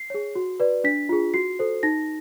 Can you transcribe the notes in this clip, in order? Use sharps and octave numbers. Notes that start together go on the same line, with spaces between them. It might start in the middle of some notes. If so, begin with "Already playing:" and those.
Already playing: C7
G#4 C#5
F#4
B4 D5
D4 B6
F4 G#4
F#4 C7
A4 C5
D#4 A#6